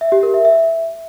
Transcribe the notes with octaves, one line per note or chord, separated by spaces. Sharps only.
E5
G4
A#4
E5
E5